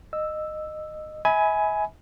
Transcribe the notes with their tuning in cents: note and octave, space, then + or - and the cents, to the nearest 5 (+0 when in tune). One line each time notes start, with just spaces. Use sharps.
D#5 -15 E6 +0
E5 -40 G#5 +10 B5 +0